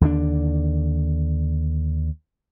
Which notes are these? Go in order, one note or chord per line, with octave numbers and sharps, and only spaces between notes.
D#2 D3 A#3 D4